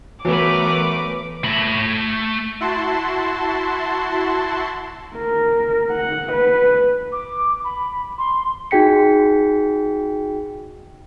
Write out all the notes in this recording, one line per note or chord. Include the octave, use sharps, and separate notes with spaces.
E3 F#3 A3 B3 A#4 B4 D6
A3 B5
E4 F#4 A5 C6
A#4
F#5
B4
D6
B5
C6
D#4 F#4 G#4 G5 B6 C#7